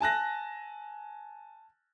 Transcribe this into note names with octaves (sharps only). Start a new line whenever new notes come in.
G#5 A5 F#6 A#6